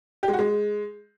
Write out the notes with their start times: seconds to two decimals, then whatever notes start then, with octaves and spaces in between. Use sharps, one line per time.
0.23 G4
0.28 G#3
0.33 F#4
0.39 G#3